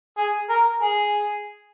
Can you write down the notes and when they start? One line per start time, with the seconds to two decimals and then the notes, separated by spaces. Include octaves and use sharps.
0.18 G#4
0.50 A#4
0.82 G#4